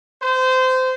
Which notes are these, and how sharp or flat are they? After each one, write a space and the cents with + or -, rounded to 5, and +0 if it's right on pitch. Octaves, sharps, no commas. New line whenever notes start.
C5 -25